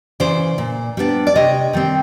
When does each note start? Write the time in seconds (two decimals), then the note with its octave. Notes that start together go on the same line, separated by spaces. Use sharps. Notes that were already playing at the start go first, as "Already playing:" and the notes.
0.20 C#3 E3 C5 D5
0.58 A#2
0.97 G3 B3 D4
1.27 D5
1.35 C3 C#5 D#5
1.73 D#3 G3 C4